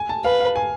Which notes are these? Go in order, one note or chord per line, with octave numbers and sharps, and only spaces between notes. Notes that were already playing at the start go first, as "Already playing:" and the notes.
Already playing: G#5
A5
B4 F5
F5
G#5